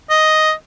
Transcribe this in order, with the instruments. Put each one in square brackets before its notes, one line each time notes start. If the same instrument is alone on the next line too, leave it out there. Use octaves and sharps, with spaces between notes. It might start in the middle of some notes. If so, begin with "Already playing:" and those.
[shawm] D#5